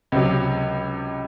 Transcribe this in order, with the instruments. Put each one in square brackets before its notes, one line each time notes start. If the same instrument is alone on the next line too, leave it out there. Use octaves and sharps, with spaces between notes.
[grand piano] C#2 C3 F#3